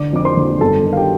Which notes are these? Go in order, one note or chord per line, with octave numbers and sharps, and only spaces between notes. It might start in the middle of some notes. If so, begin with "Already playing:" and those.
Already playing: D3 D5 D6
F2 D6
C5 C6
D3
G1 A4 A5
D#3
F5
G4 G5